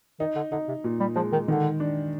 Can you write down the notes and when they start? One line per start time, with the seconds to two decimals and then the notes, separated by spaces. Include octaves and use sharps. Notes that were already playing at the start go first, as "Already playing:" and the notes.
0.20 D#3 D#4
0.36 D3
0.52 D3 D#4
0.68 C3
0.84 A#2
1.00 G3
1.16 F3 G#3
1.32 D#3
1.48 D3 D#3
1.80 D4